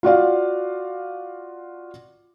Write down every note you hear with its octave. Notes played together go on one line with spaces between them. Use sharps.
F4 F#4 D5 F5